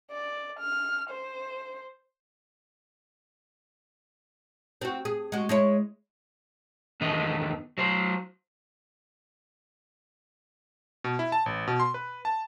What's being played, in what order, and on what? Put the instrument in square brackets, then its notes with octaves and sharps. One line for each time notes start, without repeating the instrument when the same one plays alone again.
[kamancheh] D5
F6
C5
[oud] C4 F#4
G#4
G#3 F#4
G#3 E4 C#5
[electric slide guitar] E2 D3 D#3 B3 B4 D#5
F#3 C5
[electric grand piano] B2
E4
A5
A1
B2
C6
B4
A5